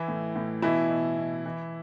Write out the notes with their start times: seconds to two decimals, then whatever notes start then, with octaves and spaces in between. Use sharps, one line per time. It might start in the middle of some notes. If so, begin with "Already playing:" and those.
Already playing: E3 E4
0.08 A2
0.36 A2
0.62 B2 E3 E4
0.90 B2
1.17 B2
1.46 E3